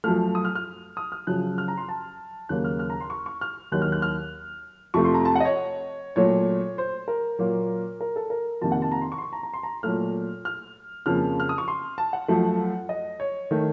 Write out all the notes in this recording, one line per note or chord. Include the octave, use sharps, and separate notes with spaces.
F#2 F3 A3 F6
D#6
F6
F6
D#6
F6
F#2 C#3 F3 F#6
F6
A#5
C6
A5
D#2 C#3 F#3 A#3 F#6
F6
F6
A#5
C6
C#6
C#6
F6
D#2 D#3 F#3 F#6
F6
F#6
F6
F2 C3 F3 A3 C#6
C6
A#5
A5
D#5 F#5
C#5
A#2 F#3 A3 C#5
C5
A#4
A#2 F#3 A#3
A#4
A4
A#4
F2 C3 D#3 A#3 A5
F#5
A5
A#5
C6
C#6
C6
C#6
A#5
A#5
C6
A#5
A#2 F#3 A3 F6
F6
F2 C#3 F3 A#3 F6
F6
D#6
C#6
C6
A5
F#5
F#2 F3 A3
D#5
C#5
D#3 A3